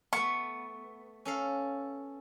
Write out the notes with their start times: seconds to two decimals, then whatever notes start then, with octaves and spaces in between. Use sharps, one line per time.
0.13 A3 B3 C#6
1.25 C#4 A4 F5